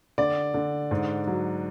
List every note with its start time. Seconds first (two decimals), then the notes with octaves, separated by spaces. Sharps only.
0.18 D3 D5
0.54 D3
0.91 G#2
1.27 F#3